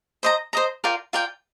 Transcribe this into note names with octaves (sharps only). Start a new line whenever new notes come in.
C5 D#5 A#5
C5 D#5 A#5
F4 A#4 D5 G5
F4 A#4 D5 G5